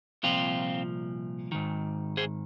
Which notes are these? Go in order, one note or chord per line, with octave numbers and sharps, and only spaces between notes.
C2 A#2 F3 C4 F4
G#2 D#3
G#4 C5